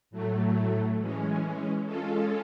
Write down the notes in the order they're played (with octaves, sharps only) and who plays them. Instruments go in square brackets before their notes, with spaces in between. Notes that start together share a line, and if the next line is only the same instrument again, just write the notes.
[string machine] A2 F#3 A3
E3 G#3 C#4
G#3 C#4 F4 A4